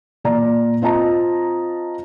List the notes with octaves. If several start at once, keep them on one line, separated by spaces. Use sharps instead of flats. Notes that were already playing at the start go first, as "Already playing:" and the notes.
A#2 D5 A#5
C4 F4 D#5 A5 A#5